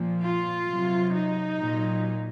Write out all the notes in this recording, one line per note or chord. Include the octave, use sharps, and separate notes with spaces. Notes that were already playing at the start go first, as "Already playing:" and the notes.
Already playing: A#2 F3
F4
C3 F#3
D#4
A#2 F#3